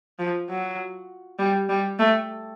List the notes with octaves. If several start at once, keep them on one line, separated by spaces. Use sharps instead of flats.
F3
F#3
G3
G3
A3